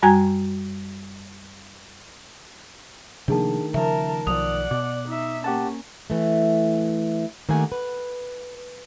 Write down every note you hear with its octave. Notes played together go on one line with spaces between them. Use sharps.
F#2 G3 F#4 G#5 A#5 G#6
C3 D#3 F3 A3 A#3 D4 G#4 A5
C#3 F3 A#4 E5 A5
B1 F3 D5 F#5 D#6 F7
B2 D6
D#4 E5
A#3 C#4 G4 F#5 A5
E3 A3
D#3 A3 A#3 G4 F#5 G#5
B4